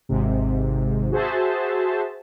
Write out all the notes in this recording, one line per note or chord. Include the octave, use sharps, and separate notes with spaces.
G#1 G#2 C3
F#4 G#4 C5 E5 A5